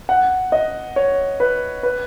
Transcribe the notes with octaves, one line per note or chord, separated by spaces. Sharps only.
F#5
D#5
C#5
B4
B4